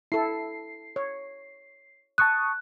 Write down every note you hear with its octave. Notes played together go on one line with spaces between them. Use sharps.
E4 A4 C7
C#5
A5 C#6 D#6 F#6